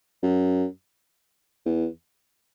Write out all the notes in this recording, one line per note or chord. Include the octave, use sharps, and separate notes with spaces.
F#2
E2